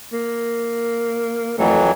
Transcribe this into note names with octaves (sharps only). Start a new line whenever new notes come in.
A#3
F2 E3 F#3 A3